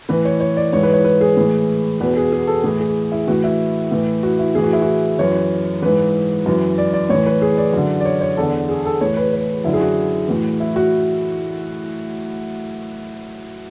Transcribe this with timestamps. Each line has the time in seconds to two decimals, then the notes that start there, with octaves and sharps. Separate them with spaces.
0.09 A2 E3 B4
0.25 C#5
0.40 C#5
0.57 D5
0.73 G#2 E3 C#5
0.83 B4
0.93 C#5
1.04 B4
1.21 G#4
1.37 A2 E3
2.00 E2 B2 B4
2.16 G#4
2.32 G#4
2.47 A4
2.64 A2 E3 G#4
2.80 G#4
3.12 E4
3.27 A2 E3 F#4
3.44 E4
3.91 A2 E3
4.23 F#4
4.39 E4
4.55 A2 E3 G#4
4.64 F#4
4.73 E4
4.82 F#4
5.19 F#2 E3 C#5
5.82 G#2 E3 B4
6.46 F#2 E3
6.78 D5
6.94 D5
7.09 A2 E3 C#5
7.26 B4
7.42 G#4
7.58 D5
7.73 F#2 D3
8.00 D5
8.05 C#5
8.21 C#5
8.37 E2 D3 A4
8.69 G#4
8.86 A4
9.01 A2 E3 C#5
9.17 B4
9.33 B4
9.64 F#2 D3 E4
9.73 G#4
9.80 F#4
10.28 A2 E3
10.60 E4
10.76 F#4